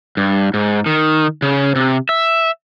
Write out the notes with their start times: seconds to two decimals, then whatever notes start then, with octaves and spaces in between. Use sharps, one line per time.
0.17 G2
0.54 G#2
0.86 D#3
1.42 C#3
1.76 C3
2.09 E5